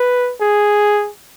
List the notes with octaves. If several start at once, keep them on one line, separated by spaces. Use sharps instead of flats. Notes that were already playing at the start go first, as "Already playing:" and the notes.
Already playing: B4
G#4